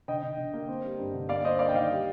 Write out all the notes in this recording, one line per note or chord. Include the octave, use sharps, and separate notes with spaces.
D3 D#5 G5
D3
D3
A#3
C4
G3
G2
D3
A#3 D5 F5
D4 C5 D#5
A#3 D5 F5
G5
D#3 D5 F5
G3